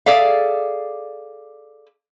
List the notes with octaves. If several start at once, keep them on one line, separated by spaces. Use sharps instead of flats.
G#4 A4 D5 E5 F5